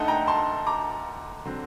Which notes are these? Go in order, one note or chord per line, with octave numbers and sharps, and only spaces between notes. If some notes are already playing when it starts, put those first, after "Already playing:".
Already playing: D2 D3 A3 D#4 F#5 A5
G5 A#5
A5 C6
A#5 D6
D3 F#3 C4